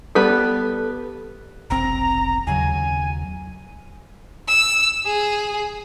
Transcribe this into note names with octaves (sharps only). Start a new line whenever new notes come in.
G3 B3 A4 B4
F1 B1 C4 A#5
D#2 C#3 F#3 G#5
E6
G#4